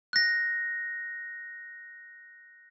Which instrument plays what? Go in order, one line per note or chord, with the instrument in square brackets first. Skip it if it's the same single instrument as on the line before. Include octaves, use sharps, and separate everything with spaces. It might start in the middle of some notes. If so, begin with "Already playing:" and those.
[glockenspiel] F#6 A#6